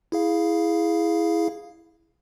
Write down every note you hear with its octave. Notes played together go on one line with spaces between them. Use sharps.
E4 G#4 F5